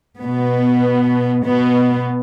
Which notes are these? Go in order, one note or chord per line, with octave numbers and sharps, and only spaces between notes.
B2 B3
B2 B3